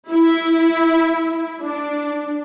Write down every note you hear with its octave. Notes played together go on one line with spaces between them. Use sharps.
E4
D4